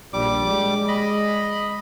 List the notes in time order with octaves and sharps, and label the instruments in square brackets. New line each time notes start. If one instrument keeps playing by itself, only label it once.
[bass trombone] A#1 [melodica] G3 D6
[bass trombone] G#3
[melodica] D#5 B5